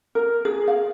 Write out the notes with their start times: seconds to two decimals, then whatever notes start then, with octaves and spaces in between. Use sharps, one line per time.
0.15 A#4
0.45 G#4
0.68 F5